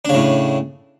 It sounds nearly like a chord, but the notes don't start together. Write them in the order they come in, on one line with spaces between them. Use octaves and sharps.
D4 C#3 A2